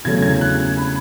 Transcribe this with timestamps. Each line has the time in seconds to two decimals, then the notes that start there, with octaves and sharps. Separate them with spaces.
0.05 E2 C#3 F#3 A3 C#4 G#6
0.22 G#6
0.41 F#6
0.77 B5